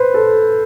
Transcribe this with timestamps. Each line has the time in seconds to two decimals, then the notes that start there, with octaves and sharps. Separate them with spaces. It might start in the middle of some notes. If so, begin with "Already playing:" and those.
Already playing: B4 C5
0.14 A4